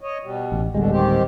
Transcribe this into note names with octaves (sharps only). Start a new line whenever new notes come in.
C#5 D#5
B2 G3
A1
D1 B2 D3 G3 G#3
D#3 C4 G4